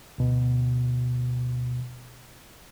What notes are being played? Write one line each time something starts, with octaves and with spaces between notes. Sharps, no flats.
D2 B2